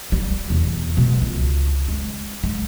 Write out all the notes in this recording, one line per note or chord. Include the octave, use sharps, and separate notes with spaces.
G3
E2 B2
B2 G#3
C#2
G#3
G#3